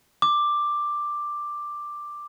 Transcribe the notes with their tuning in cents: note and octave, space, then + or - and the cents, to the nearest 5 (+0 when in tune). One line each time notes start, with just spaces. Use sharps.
D6 +5